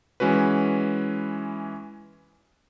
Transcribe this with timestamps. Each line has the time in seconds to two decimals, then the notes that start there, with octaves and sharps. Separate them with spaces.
0.20 E3 G#3 C#4 F#4 B4